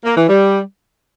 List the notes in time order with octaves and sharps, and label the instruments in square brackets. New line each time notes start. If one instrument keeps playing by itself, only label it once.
[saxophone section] A#3
E3
G3